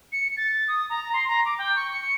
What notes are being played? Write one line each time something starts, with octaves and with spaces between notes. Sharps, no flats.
C#7
A6
D#6
A#5
C6
A#5
D6
G5
C#6
C#7